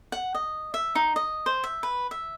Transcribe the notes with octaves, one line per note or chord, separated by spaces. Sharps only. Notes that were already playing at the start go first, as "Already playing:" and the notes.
F#5
D#5
E5
D#4
D#5
C5
E5
B4
E5